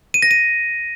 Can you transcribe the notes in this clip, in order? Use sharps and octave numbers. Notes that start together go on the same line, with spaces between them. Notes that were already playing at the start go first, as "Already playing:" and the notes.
D#7
A#6
D#7